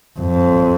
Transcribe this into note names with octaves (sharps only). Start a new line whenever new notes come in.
F2